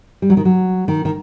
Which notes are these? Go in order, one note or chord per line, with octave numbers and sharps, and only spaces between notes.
G3
F#3
D#3
F#3
D#3
D#3